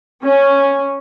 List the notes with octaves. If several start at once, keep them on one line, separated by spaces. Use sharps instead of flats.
C#4